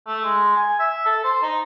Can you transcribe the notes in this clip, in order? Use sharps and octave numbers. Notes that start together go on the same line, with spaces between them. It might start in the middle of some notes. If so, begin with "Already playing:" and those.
A3
G#3
G#5
E5
A4
C5
D#4